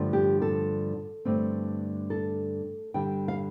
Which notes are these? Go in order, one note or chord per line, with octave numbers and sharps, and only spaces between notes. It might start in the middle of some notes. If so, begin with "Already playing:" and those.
Already playing: G2 D3 F3 A3
G4
A4
G2 D3 A3 C4
A4
G2 D3 G3 G5
F5